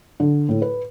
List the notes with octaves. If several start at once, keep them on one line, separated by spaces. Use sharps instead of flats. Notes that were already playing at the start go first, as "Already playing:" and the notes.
D3
A2
B4